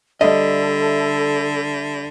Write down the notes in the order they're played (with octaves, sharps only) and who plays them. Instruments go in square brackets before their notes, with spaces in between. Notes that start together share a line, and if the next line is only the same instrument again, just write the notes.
[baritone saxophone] D3 [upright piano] G3 E5 [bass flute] A4 [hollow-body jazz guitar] D#5